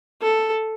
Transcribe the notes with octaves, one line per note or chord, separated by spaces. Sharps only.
A4